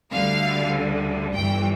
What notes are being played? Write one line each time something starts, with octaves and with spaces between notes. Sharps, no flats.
D2 D3 G3 F5
G1 G2 E3 G3 G5